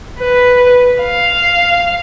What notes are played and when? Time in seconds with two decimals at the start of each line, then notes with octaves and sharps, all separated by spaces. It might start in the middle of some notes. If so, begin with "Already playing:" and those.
0.19 B4
1.02 F5